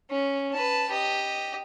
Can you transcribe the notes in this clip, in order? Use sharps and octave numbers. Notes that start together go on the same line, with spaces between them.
C#4
B4 A5
G4 D#5